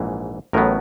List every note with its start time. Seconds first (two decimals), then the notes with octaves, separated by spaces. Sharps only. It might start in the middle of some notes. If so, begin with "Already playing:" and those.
Already playing: A#1 G#2 E3
0.53 A1 A2 F#3 B3 A#4